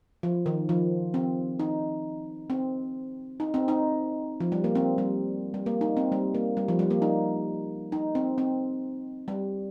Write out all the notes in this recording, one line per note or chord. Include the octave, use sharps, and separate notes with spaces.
F3
D#3
F3
C4
D#4
C4
D#4
C4
D#4
F3
G3
A#3
C4
G3
G3
A#3
D#4
C4
G3
A#3
G3
F3
G3
A#3
D#4
D#4
C4
C4
G3